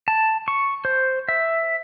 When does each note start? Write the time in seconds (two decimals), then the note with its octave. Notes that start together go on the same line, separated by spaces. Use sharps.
0.08 A5
0.48 C#6
0.85 C5
1.29 E5